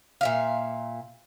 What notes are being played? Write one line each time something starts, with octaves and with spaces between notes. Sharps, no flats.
A#2 E5 F5